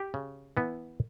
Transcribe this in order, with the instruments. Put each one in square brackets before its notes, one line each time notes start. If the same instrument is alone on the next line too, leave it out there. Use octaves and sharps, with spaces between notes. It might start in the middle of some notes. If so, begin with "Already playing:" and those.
Already playing: [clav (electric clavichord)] G4
C#3
E3 B3